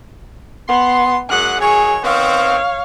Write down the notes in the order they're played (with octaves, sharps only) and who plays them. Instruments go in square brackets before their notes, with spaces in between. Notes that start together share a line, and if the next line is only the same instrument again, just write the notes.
[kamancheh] B3 [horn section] C6
[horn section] F#2 G#3 F#5 [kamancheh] F#6
[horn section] D#3 F#3 C#5 [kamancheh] G#4
[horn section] D#3 B3 C4 [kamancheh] C#5 F5